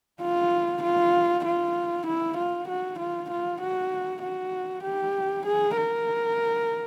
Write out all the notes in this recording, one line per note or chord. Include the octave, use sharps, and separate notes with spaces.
F4
F4
F4
E4
F4
F#4
F4
F4
F#4
F#4
G4
G#4
A#4